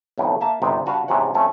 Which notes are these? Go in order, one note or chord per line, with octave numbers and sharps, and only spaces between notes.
B1 F2 A2
A#3 E5 A5
G1 C3 D#4 F#4 B4
G2 F#4 B4 F5 A5
E2 G#2 C3 F#3 C#4 F#5
F2 A3 C#4